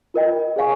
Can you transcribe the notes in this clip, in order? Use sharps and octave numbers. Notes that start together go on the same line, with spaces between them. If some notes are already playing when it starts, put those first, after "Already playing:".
F4 A#4 D#5 G5
G#4 C#5 F5 G#5 C#6